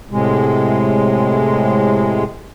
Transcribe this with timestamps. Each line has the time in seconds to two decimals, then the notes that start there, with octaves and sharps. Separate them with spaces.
0.11 A2 C3 G#3